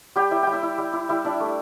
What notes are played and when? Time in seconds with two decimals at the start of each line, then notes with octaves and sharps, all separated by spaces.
0.16 G3 G4 G5
0.31 E4 E5
0.42 G3 G5
0.53 E4 E5
0.63 E4
0.78 G3
0.93 E4
1.09 G3 E4 E5
1.24 D4 E4 D5
1.40 A3